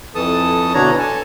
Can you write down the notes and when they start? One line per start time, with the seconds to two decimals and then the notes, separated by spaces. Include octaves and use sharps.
0.15 F2 E3 A4 A5 D#6
0.74 B2 D3 E3 D4 C#5 A#5
0.99 A4 G#5 A5